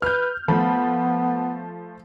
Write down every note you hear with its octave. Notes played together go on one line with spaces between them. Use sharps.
B4 F6 G6
F3 A3 B3 B5